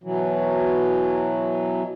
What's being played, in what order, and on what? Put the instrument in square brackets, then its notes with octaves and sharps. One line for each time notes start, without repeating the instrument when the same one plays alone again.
[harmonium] B2 E3 F#3